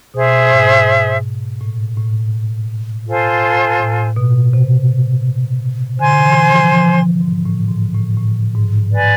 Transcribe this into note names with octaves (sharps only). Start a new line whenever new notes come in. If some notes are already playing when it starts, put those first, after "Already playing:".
B2 G#4 C5 E5
G#2
A2
A2
F4 A4 C5 G#5
A2
B2
C3
D3 C5 G#5 C6
E3
F3
F3
F3
G#2
A2
G#2
A2
A2
G#2
B4 D5 G#5